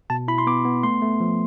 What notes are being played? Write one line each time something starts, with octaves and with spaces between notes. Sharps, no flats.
B2 A5
E4 B5
C6
B3 D6
B3
A3 C6
A3
F3